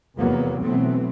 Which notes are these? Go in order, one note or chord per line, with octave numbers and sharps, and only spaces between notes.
F1 E2 C3 F#3 A#3 B3
B2 E3 F#3 A3 B3 C4